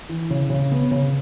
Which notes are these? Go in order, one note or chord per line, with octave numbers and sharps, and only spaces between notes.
E3
C#3
C#3
B3
C#3